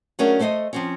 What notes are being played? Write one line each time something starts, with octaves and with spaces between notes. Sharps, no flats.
F#3 A3 C#4 D4 G#4 A#4
A3 A4 C5 D5 D#5
F3 C4 C#4